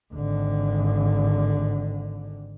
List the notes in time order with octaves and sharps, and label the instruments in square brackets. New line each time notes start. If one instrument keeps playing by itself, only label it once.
[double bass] G#1 D3